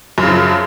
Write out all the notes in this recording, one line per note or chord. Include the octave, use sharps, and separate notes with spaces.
F#2 C#3 F3